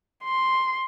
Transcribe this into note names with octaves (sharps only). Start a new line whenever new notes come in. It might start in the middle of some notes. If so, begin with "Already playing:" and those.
C6